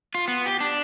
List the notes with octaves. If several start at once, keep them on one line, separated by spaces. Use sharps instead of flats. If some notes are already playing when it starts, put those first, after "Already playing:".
F4
B3
G4
D4